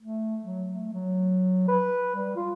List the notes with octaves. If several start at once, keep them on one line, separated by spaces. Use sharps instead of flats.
A3
F#3
A3
F#3
B4
G3
F4